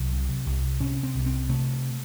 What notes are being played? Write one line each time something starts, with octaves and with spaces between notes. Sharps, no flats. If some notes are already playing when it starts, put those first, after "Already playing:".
Already playing: C2 F#3
C3
C2
C3 C#4
C4
C2
C4
C3 A3